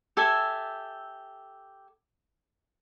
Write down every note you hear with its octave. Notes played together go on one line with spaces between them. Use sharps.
G4 A4 E5 G#5